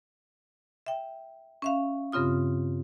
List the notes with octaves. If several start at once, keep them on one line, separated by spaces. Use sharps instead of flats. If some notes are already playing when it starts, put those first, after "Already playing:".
E5 G5
C#4 E5 F5
G2 C#3 C4 F4 D#6